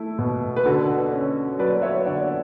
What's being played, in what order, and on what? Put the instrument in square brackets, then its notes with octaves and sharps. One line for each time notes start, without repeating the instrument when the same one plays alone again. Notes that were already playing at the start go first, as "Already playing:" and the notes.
Already playing: [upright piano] A3 E4
B2
B4
D3 F#4 A4
C#4
F#3 B4 D5
C#5 E5
D3 D5 F#5